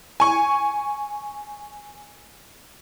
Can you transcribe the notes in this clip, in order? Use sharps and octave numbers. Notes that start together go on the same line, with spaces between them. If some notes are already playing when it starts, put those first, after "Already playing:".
G#5 C#6